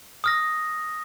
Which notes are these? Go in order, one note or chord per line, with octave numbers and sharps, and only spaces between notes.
D#6 F6 A#6